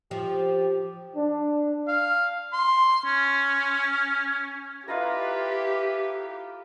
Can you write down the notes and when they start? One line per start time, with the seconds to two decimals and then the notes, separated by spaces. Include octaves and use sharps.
0.11 F3 G4
1.16 D4
1.88 F5
2.53 C6
3.05 C#4
4.88 E4 F4 G4 A4 B4 D#5 A#5